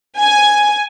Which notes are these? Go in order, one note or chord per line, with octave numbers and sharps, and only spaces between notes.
G#5